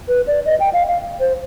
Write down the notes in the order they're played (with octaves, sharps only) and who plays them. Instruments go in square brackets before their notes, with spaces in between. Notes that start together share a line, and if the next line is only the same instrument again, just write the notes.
[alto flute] B4
D5
D#5
G5
F5
F5
C5